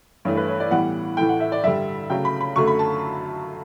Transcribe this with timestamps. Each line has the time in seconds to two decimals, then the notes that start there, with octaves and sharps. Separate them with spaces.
0.25 G2 E3 A3 C#5
0.37 B4
0.48 C#5
0.60 D5
0.71 A2 E3 G3 B3 F#5
1.17 A2 E3 A3 G5
1.29 F#5
1.40 E5
1.52 D5
1.64 G2 D3 G3 E5
2.10 C#3 F#3 A3 G5
2.25 B5
2.41 B5
2.56 F#2 D3 F#3 A3 C#6
2.67 B5
2.79 A5